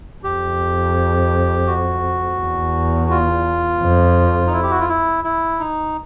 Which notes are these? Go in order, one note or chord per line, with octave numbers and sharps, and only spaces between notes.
F2 G4
F#4
E2
F4
F2
D#4
E4
G4
F#4
F4
E4
E4
D#4